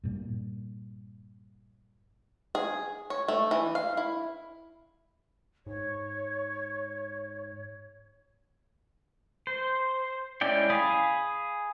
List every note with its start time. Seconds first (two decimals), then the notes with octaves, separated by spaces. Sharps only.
0.03 G2 A#2
2.55 G#4
3.10 C#5
3.28 A3
3.51 E3
3.75 F5
3.97 E4
5.66 G#2 C#5
9.47 C5
10.41 G#3 C#4 E4 D5 G5
10.70 G#4 F5 G#5 B5 D#6